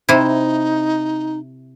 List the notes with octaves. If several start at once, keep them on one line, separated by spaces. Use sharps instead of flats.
C3 D#4 E4